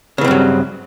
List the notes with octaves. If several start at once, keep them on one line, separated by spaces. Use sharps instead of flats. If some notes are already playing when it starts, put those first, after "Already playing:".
G2 C#3 E3 F#3 C4